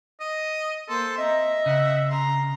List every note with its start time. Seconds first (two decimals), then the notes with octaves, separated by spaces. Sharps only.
0.20 D#5
0.89 A#3 A4 C5 C6
1.18 C4 D#5 E5 A#5
1.66 C#3 F#5
2.08 A#5 C6